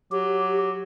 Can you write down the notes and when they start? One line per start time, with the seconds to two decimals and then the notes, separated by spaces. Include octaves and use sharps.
0.12 F#3 G4